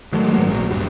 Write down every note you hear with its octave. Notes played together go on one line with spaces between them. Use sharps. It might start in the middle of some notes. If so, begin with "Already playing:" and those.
D#3 F#3 G#3 A3
G#2 F#3 A#3
A#1 F#3
D#1 G2 G3